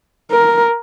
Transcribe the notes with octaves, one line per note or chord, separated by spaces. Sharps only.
A#4